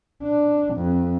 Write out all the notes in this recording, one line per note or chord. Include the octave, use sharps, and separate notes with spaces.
D4
F2